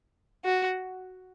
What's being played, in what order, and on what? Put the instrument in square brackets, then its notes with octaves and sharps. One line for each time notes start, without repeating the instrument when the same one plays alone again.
[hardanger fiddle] F#4